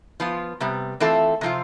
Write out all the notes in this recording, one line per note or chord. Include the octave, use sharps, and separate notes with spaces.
F3 B3 F4
C3 G3 B3
E3 A3 C4 F4 A4
C3 F3 C4 F4